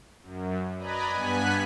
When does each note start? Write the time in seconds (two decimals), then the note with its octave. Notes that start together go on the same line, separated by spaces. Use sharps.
0.22 F#2
0.78 B4 D5 D#5 G#5 A#5 B5
1.09 G2 B3 G#5 F#6 B6